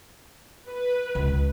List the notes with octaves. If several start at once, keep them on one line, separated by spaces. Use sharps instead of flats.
B4
C#2